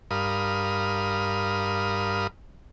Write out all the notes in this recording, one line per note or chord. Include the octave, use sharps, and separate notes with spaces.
G2 A#4 F5 B5 D#6